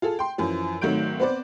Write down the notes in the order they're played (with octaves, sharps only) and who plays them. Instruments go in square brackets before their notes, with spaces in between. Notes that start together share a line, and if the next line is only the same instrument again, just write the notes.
[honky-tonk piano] F4 G#4 A4
G5 C6
F#2 E3 F3
G#1 D#3 F#3 A3 G6 D7
B3 C4 B4 C5 D5